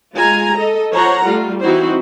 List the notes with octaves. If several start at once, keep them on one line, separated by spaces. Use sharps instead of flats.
G#3 F4 G#5 A#5
A4 D#5
F3 C5 C#5 F#5 A#5
G3 A3 F4
E3 C4 D#4 E4 F#4 C5